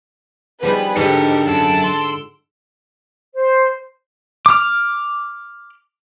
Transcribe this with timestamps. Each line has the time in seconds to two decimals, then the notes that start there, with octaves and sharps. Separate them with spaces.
0.63 F3 G3 B3 D#4 G#4 B4
0.97 G#2 D3 D#4 G4 A4 A#4
1.47 F#2 F#5 A5 E6 D7
1.84 C6
3.34 C5
4.46 D6 F6